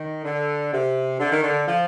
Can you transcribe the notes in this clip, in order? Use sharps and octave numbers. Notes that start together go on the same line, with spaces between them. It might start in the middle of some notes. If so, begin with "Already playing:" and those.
Already playing: D#3
D3
C3
D3
D#3
D3
F3